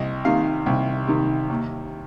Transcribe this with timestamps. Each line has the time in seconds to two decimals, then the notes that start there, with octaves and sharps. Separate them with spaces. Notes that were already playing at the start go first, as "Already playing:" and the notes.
Already playing: C2 D#5
0.25 C3 D#3 F5
0.66 C2
1.08 C3 D#3
1.50 D#2